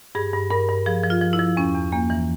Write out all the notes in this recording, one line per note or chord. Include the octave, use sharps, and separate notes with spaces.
G2 G#4
G2
G2 A#4
G2
F3 G#4
F3
F4
F3
E4
F3
E2 C#4
E2
E2 A#3
E3